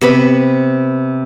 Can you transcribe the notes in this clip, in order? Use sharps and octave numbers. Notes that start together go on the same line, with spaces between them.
C3 B3 B5